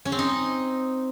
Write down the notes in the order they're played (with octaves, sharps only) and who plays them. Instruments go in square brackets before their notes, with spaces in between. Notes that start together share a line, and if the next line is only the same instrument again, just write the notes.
[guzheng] C#4
C4
D#4